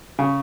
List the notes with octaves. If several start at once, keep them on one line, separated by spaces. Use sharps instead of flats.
C#3